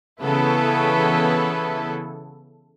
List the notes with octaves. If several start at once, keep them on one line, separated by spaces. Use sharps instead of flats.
C#3 E3 B3 E4 A4 B4